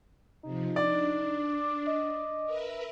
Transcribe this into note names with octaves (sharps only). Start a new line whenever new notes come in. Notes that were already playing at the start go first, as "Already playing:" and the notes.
C3 F3 D#4
D4 D5
D6
D#5
A#4 B4 E5